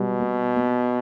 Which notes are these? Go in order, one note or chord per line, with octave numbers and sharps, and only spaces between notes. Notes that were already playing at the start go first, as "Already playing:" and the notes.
Already playing: B2 G3
B3
B3